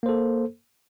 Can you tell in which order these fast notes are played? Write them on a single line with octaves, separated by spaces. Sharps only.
A#3 C5 A4